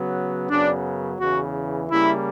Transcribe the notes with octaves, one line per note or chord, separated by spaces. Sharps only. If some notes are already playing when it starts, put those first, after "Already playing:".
Already playing: C#3 F#3 B3
F#2 C#3 F#3 B3 D4
E2 C#3 E3 F#4
C#3 G3 A#3 E4